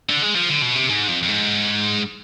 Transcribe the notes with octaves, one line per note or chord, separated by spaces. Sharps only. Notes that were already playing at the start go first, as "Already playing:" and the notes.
D3
G#3
F3
D3
B2
C3
G#2
F2
F2
G#2